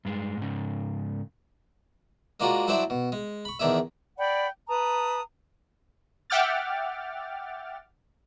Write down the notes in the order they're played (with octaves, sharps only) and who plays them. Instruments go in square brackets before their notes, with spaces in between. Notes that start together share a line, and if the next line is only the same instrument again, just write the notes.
[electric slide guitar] G2 G#3
G#2 C#3
[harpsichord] G#3 A#3 D4 F4 F#4 A#4
F#3 D4 E4 C5 D5 E5
B2
G#3
B5 C#6
E2 D#3 D4 G#4 E5
[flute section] D5 F#5 G5 B5
B4 A5 A#5 D#6
[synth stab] E5 F#5 G5 D6 F6 A6